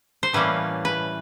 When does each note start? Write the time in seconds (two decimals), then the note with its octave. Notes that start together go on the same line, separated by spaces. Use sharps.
0.23 C5
0.33 A2 E3 G3 A#3 C#4 B4
0.85 B4